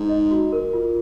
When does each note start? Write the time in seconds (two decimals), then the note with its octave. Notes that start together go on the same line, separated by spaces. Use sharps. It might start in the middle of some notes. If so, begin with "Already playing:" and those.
Already playing: G#2 D#4
0.09 D#5
0.31 F#4
0.53 A#4
0.73 F4